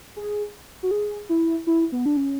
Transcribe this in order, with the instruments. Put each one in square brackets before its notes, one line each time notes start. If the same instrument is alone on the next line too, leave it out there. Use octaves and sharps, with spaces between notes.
[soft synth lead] G#4
F#4
G#4
E4
E4
B3
D4
C#4